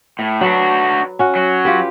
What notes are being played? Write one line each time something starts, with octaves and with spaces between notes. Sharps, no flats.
A2
F#3 D4 F#4 B4
C#4 F#4 F#5
F#3
F4 G4 B4